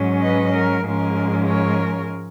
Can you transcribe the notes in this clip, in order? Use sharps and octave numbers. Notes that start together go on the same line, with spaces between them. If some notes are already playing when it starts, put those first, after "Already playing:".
Already playing: G#2 F#3 C#4
B4 D#5
A#4
G#2 F3 G#3 C#4 A#4
A#4 C#5